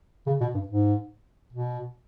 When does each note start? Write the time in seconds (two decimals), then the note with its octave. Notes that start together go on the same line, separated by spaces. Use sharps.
0.27 C#3
0.40 B2
0.54 G2
0.68 G#2
1.53 B2